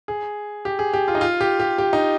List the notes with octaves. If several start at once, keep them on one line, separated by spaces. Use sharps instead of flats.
G#4
G4
G#4
G4
F4
D#4
F4
G4
G4
G4
D#4